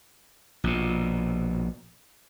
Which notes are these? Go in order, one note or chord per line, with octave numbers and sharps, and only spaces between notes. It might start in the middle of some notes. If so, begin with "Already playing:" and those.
A#1 B2